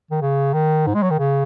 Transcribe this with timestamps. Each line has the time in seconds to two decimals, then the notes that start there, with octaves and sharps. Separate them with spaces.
0.11 D#3
0.22 C#3
0.54 D#3
0.87 G#2
0.94 G#3
1.03 F#3
1.10 D#3
1.19 C#3